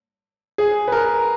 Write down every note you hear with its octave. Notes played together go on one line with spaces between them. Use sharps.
G#4
B4
A#4